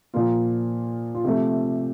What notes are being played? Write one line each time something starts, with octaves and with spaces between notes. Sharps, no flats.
A#2 F3 A#3 F4
F4
C3 F3 A3 G4